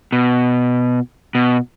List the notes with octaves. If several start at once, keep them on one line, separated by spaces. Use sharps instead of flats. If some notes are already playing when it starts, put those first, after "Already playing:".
B2
B2